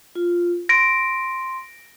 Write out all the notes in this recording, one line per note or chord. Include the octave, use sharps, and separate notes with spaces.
F4
C6 A#6 D7